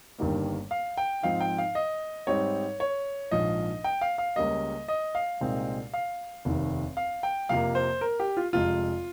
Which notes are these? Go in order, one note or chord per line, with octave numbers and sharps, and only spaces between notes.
G1 G2 D#3 G3 A#3
F5
G5
G#2 F3 C4 D#4 F5
G5
F5
D#5
G#2 G3 C4 D#4 C#5
C#5
A#1 G#2 F3 D#5
G5
F5
F5
C#2 C#3 G3 A#3 D#5
D#5
F5
C2 A#2 G#3 C4 D#4
F5
F1 D#2 D#3
F5
G5
F2 C3 F3 A#3 F5
C5
A#4
G4
F4
F1 F2 C3 F3 G#3 F4